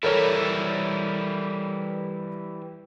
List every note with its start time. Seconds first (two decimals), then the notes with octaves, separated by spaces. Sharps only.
0.03 E3 G3 E4 A4 A#4 C#5